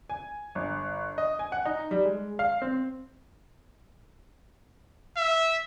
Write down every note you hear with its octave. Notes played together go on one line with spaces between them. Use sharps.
G#5
G1
D#5
G#5
F#5
D#4
G3
G#3
F5
C4
E5